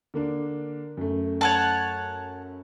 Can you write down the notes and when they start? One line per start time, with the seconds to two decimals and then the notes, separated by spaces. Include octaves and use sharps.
0.14 D3 A#3 D4
0.97 F#2 A3
1.41 C#5 F#5 A5